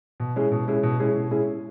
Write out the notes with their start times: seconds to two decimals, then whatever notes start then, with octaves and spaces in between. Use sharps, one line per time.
0.20 B2
0.36 G#3 C#4 E4 G#4
0.52 B2
0.68 G#3 C#4 E4 G#4
0.83 B2
0.99 G#3 C#4 E4 G#4
1.15 B2
1.31 G#3 C#4 E4 G#4